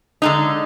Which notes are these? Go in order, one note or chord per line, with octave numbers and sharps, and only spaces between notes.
D3 G#3 D#4